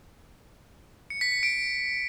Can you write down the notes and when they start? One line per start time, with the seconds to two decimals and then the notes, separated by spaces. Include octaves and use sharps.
1.10 C#7
1.21 B6
1.32 C#7
1.43 D7